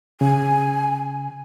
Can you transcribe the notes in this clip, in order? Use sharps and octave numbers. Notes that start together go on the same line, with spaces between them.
C#3 G#5